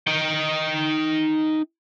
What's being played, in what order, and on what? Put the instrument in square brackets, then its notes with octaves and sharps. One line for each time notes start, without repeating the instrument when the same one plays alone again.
[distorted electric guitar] D#4 G5